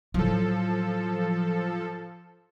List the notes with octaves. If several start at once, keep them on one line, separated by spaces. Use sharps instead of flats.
A2 F3 F#3 A4